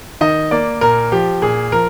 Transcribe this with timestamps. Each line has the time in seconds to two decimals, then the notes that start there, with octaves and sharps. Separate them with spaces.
0.21 D#3 D#5
0.51 A#3 D5
0.81 A#2 A#4
1.12 F3 G4
1.42 A#2 G#4
1.72 F3 A#4